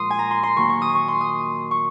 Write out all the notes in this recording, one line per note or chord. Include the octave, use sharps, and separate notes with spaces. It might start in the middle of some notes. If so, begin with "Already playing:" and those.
Already playing: A#2 F3 G#3 C6 D#6
G#5
A#5
C6
C6
D#3 F#3 A#3 C#6
C#6
D#6
C#6
C6
D#6
C#6